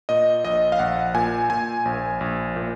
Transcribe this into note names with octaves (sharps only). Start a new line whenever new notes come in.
A#2 D#5
A#1 D#5
F5
A#1 F#5
A#2 G#5
A#2 G#5
A#1
A#1
A#2